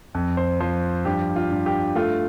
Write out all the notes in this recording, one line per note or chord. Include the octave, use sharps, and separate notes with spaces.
F2
C5
F3 C5
G2 G4
F4
G2
G4
A3 F4